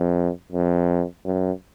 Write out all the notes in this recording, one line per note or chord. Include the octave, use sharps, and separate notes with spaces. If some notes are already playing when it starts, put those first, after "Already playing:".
Already playing: F2
F2
F#2